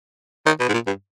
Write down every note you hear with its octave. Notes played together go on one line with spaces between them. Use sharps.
D#3
B2
G#2
A#2
G2